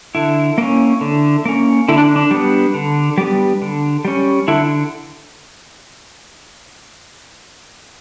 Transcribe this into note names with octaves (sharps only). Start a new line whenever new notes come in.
D3 E4
A#3 C#4
D3
A#3 C#4
D3 E4
D4
D4
G3 B3
D3
G3 B3
D3
G3 C#4
D3 E4